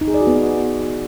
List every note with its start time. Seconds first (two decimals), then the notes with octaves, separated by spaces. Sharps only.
0.01 D#4
0.08 G#4
0.14 D5
0.21 F#4
0.27 B3